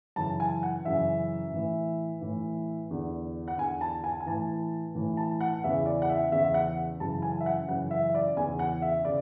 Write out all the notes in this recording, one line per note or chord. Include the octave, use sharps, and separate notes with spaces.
F#2 C#3 E3 A5
G#5
F#5
F#2 C#3 E3 E5
A2 E3
A2 E3
E2 D3
F#5
E2 D3 G#5
A5
G#5
G#5
A2 E3 A5
A2 E3
A5
F#5
E2 C#3 E3 E5
D5
F#5
E5
E2 C#3 E3 E5
E5
F#5
F#2 C#3 E3 A5
G#5
E5
F#5
F#2 C#3 E3 F#5
E5
E5
D5
E2 C#3 E3 G#5
F#5
E5
C#3 D5